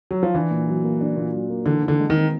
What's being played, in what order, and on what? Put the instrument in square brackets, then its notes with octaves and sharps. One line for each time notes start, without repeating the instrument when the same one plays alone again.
[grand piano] F#3
F3
[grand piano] E3 [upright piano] D4
[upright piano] A#2
F#3
A#3
D4
A#2
F#3
A#3
[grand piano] D3 [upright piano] E3
[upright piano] E3
[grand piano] D3
[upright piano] G#3
[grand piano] D#3
[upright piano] C4